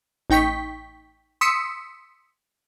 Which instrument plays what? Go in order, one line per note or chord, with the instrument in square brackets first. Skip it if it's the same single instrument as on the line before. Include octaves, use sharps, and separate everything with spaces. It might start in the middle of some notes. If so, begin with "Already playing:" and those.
[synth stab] A1 D#4 G5 C#6 B6
C6 D#6 E6 B6 C#7